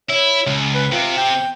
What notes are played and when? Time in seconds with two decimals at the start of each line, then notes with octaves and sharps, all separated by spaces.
0.09 E4 C#5
0.47 C#2
0.75 B4
0.92 C3 C4 F4
1.18 G5